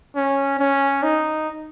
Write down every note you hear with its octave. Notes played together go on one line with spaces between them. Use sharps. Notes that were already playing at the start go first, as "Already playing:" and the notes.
C#4
C#4
D#4